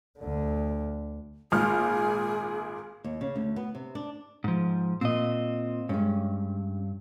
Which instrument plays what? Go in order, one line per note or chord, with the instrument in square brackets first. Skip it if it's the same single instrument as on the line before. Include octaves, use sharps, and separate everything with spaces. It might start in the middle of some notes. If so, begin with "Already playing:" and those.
[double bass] D2 D3
[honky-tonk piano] G#1 A#2 F6 [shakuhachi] G#4
[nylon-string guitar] D#2
C#3
D2
B3
C3
D4
[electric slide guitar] G#2 F3
[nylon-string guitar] A#2 [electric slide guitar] C4 D#5
[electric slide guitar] G2 [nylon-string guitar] G#3 C#4